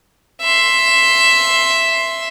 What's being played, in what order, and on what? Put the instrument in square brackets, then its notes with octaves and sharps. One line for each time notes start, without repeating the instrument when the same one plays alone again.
[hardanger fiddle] E5 C6